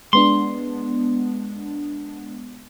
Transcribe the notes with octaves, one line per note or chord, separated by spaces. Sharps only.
G#3 B3 D4 C6